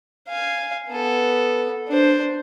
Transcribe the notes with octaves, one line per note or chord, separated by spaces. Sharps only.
F5 G#5
B3 A4
D4 C5